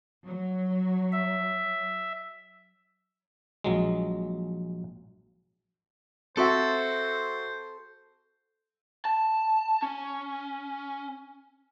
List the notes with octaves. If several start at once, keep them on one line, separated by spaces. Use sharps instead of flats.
F#3
E5
A#1 F#3 G#3
C4 F#4 A4 C5 E5
A5
C#4